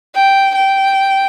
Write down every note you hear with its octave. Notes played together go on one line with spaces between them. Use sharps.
G5
G5